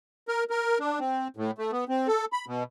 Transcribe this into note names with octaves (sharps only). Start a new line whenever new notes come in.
A#4
A#4
D4
C4
A2
A3
B3
C4
A4
B5
B2